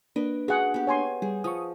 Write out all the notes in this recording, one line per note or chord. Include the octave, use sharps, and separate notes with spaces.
A#3 D4 B4 D#5
F#4 G#4 F#5
B3 G4
C#5 G#5 C6
G3 G#4
F3 C#6 D#6